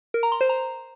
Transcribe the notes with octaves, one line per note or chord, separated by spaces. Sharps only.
A#4
A#5
C6
C5
A#5